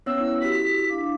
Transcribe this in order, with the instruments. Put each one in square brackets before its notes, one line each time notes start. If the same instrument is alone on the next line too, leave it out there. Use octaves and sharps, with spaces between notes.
[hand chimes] B3 C#4 C#5 [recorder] E6
[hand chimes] E4
[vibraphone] F#4 G4 E6 [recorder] B6
[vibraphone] D4 F5 D6